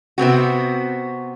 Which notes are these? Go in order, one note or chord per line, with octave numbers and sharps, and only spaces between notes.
C3 B3 C4 F#4